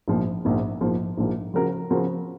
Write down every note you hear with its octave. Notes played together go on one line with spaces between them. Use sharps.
A#1 G#2 F3 A#3
A#1 G#2 F3 A#3
A#1 G#2 F3 A#3
A#1 G#2 F3 A#3
C#3 F3 C4 F#4 A#4
C#3 F3 C4 F#4 A#4